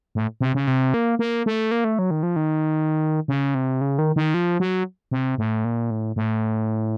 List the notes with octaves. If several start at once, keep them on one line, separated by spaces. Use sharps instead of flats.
A2
C3
C#3
C3
A#3
A#3
A3
A#3
A3
F#3
D#3
F3
D#3
C#3
C3
C#3
D#3
D#3
F3
F#3
C3
A2
A#2
A2
A2